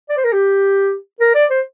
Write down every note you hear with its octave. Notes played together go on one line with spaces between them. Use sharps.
D5
C5
A#4
G4
A#4
D5
C5